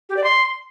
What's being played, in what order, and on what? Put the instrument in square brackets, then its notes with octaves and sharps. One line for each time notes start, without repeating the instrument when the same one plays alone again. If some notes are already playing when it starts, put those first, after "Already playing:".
[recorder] G4
D5
C6